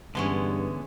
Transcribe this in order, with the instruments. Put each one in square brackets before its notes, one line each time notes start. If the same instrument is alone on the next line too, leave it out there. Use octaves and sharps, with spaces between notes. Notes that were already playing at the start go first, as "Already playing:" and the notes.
[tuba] G2 [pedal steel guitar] D3 B3 [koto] E3 G#3 C#4